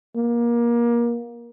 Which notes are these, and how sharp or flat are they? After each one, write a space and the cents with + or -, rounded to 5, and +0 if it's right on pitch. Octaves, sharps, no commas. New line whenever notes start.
A#3 +25